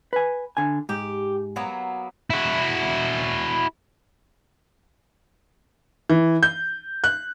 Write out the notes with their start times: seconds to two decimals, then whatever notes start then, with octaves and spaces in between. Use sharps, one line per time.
0.13 B4 G#5
0.57 D3 G#5
0.89 G#2 G4
1.56 F#3 A#3 B3
2.30 E4 F#4
6.10 E3
6.43 G6
7.04 F#6